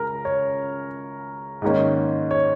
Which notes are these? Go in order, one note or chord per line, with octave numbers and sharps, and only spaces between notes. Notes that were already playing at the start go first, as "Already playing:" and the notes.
Already playing: C#2 C#3 A#4
C#5
G#2 D#3 A#3 C#4
C#5